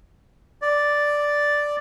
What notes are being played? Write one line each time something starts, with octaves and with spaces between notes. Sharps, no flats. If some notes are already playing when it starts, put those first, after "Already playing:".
D5